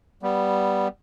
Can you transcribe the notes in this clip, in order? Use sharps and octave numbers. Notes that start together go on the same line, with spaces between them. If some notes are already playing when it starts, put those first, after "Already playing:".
G3 B3